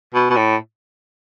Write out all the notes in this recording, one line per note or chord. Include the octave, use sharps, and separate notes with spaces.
B2
B2
A2